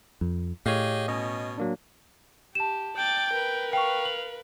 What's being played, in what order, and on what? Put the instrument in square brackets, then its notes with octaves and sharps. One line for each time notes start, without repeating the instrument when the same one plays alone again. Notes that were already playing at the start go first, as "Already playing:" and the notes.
[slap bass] F2
[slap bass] A2 [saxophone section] G4 G#4 D#5 [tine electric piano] C#5 F5
[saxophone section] B2 C#4 [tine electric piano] D#5
[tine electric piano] F#3 A#3 D4
[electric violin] G4 [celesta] A5 E7
[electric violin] D5 A6 [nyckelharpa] G5
[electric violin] A#4 B4
[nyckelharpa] F5 [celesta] G5 C#6
[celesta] F#7